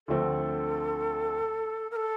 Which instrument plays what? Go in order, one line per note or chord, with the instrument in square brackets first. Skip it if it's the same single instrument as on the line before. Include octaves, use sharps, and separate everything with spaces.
[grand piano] D2 D3 F3 A3 C4 [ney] A4
[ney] A#4
A4